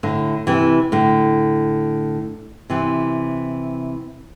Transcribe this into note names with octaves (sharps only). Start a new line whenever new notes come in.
A2 D3
C3 E3
A2 D3
C3 E3